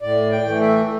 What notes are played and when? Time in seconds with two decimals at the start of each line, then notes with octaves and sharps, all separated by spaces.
0.02 A2 D5
0.32 G5
0.46 E3 A3
0.61 E5